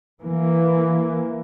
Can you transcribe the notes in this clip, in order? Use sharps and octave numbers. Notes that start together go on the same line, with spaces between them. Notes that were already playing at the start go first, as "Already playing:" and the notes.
E3 A#3